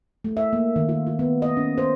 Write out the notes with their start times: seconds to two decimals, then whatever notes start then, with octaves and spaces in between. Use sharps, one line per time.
0.24 A3
0.37 E5
0.53 A#3
0.76 D#3
0.89 F4
1.07 F4
1.19 B3
1.42 D#5
1.57 C#4
1.78 C5